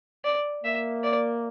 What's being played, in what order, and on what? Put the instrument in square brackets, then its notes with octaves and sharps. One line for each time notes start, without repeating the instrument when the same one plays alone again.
[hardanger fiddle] D5
[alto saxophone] A#3 [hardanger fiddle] E5
[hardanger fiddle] D5